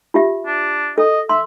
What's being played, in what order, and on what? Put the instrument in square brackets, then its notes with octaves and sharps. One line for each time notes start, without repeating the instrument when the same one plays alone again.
[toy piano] F4 G4 E5
[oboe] D4
[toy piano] A4 [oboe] D#5
[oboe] E5 [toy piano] C6